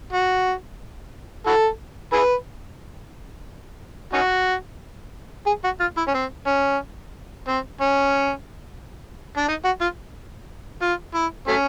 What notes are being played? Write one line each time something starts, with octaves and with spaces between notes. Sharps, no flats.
F#4
E4 F#4 A4
E4 G#4 B4
C#4 D#4 F#4
G#4
F#4
F4
E4
C#4
C4
C#4
C4
C#4
D4
D#4
F#4
F4
F4
E4
F#3 A3 C#4